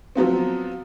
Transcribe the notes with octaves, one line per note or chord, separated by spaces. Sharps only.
F3 F#3 B3 C4